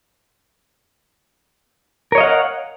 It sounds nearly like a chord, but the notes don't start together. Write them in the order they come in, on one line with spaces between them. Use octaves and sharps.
A#4 C#5 D#5 F5 F#5